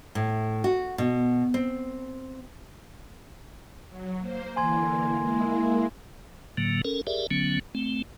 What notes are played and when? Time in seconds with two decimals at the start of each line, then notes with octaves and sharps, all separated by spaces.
0.15 A2
0.64 F#4
0.98 B2
1.54 C4
3.89 F#3
4.20 A#3 C5
4.56 D3 E3 A#3 G#5 C6 G#6
5.20 G#3 A#3 E4
6.57 A2 D3 F#3 A#3
6.85 C#4 A4 A#4
7.07 G4 G#4 A#4 D5 E5
7.31 D3 F#3 B3 C#4
7.75 A3 C4